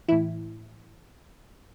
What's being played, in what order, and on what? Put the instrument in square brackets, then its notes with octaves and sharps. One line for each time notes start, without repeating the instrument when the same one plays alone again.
[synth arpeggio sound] A2 E3 E4